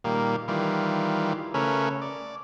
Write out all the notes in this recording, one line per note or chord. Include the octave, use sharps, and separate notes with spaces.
A#2 D#3 G3 A#3
D#3 E3 G3 F4
C#3 A3 C#4 A#4 B4
D5